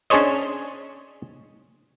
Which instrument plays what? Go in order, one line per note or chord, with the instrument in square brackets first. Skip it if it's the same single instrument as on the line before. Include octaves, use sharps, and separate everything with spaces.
[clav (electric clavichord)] C#4 D4 G#4 C5 C#5 D#5